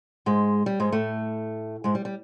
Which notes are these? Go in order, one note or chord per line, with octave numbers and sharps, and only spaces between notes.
G#2 G#3
G3
G#2 G#3
A2 A3
G#2 G#3
G3
G3